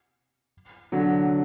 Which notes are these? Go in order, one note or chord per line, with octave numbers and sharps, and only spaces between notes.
D3 F#3